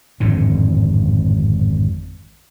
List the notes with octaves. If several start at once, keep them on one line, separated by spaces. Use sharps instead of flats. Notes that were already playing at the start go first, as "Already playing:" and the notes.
G#1 F2 A2 D3